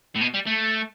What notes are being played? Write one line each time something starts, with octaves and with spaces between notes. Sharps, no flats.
A2
B2
G3
A3